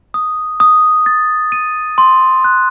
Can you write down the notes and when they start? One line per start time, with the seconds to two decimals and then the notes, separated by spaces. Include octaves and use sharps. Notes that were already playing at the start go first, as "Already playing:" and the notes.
0.14 D#6
0.60 D#6
1.06 A6
1.52 D#7
1.98 C6
2.44 F#6